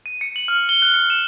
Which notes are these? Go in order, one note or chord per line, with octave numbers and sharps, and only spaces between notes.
D#7
C#7
F#7
F6
G7
F#6
C#7
E7